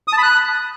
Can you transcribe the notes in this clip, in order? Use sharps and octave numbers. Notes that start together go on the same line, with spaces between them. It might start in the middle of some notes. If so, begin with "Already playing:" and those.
D#6
A5
B5
F#6